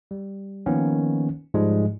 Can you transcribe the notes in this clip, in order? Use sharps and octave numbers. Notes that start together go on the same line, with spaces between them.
G3
D#3 F3 A#3 B3 C#4
G#2 F3 G3 G#3